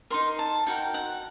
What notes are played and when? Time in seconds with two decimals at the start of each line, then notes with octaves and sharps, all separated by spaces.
0.10 D#4 F#4 A#4 C6
0.39 A5
0.67 D#4 F#4 A#4 G5
0.94 F#5